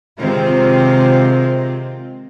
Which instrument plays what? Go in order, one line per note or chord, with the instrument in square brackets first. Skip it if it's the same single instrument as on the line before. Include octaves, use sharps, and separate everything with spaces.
[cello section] C3 D#3 G#3 C4 F4